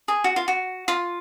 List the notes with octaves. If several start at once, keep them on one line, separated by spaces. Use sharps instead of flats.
G#4
F#4
F4
F#4
F4